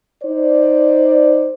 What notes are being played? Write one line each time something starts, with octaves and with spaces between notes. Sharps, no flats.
D#4 C5 D5